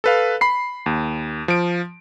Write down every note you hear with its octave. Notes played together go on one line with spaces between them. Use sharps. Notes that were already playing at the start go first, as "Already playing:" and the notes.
A4 B4 F5
B5 C7
D#2
F3 D7